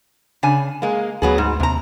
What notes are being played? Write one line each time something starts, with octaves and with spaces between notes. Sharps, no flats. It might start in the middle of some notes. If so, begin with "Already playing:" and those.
C#3 D4 G#5
G#3 A#3
D2 F#3 B3 G#4
G#2
D#2 C3 A#5